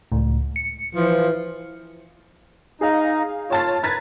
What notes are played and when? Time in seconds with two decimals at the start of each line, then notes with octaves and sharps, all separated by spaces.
0.12 C#2 A2
0.56 C#7
0.95 E3 F3
2.81 D#4 G#4 F5
3.50 F4 C#5 A5 A6
3.83 B4 A#5 G#6 A6